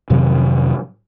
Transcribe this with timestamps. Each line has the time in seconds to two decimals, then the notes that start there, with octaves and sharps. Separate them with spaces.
0.10 F2 C3 D#3 F#3